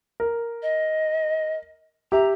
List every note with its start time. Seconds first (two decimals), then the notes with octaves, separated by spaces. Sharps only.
0.20 A#4
0.62 D#5
2.12 G4 E5 A#5